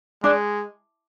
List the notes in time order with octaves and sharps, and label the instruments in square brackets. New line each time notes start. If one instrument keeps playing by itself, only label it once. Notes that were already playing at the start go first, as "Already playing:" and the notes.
[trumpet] G#3 [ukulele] D4